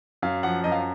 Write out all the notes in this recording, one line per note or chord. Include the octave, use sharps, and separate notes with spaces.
F#2 F5
F3 F#5
F#2 D#5
F5